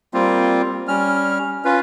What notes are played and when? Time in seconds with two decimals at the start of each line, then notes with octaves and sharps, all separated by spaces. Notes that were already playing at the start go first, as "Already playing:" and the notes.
0.14 G3 A#3 C4 F4
0.88 G3 C#4 F6
1.65 C#4 F4 B4